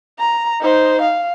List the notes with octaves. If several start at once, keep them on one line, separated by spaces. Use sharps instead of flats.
A#5
D#4 C5
F5